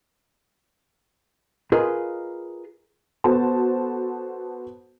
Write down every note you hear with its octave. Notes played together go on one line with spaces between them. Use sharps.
F4 G#4 A#4 B4 D#5
B3 F#4 A4 C5 A5